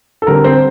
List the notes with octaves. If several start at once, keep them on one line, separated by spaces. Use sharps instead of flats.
A4
D3 G3 C4 A#4
C4 C5